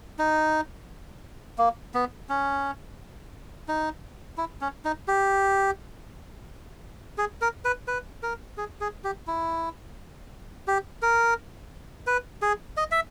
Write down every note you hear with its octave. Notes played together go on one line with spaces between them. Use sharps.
D#4
A#3
B3
C#4
D#4
E4
C#4
D#4
G4
G#4
A#4
B4
B4
A#4
G#4
G#4
G4
E4
G4
A#4
B4
G#4
D#5
E5